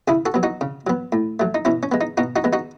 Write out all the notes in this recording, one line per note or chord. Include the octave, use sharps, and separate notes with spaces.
C#3 E4 G#4
F#4 A4
F#3 B3
D#4 F#4
C#3
F#3 B3
A2
F#3 A3
D#4
B2 C#4 E4
C#4
G#3 B3
D#4
B2 D#4 F#4
D#4 F#4
G#3 B3
D#4 F#4